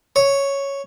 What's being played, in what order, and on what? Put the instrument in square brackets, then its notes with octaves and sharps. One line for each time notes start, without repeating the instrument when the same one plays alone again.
[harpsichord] C#5